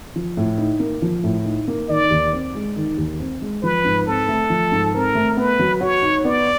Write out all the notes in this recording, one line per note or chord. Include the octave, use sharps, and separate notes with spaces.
F3
A2
D#4
A#3
F3
A2
D#4
A#3
D#3 D5
D#2
C4
G#3
D#3
D#2
C4
G#3
F3 B4
G#2
C4 A4
A3
F3
G#2
C4 A#4
A3
B3 B4
F#3
F#4 C#5
D#4
B3 D5